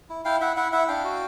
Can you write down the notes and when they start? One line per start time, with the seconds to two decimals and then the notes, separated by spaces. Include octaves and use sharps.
0.10 E4
0.25 E4 F5 G5
0.41 E4 E5 F#5
0.57 E4 E5 F#5
0.72 E4 E5 F#5
0.88 D4 F5 G5
1.04 F#4